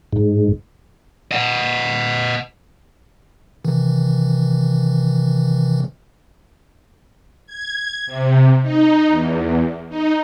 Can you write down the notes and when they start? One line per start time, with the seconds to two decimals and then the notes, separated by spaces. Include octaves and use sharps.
0.13 G#2
1.32 D#5 F#5
3.65 C3 D#3 E3
7.46 G#6
8.06 C3
8.62 D#4
9.09 E2
9.89 D#4